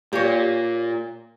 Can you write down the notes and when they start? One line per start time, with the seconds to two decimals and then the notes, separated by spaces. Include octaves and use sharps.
0.13 A#2 G4 C#5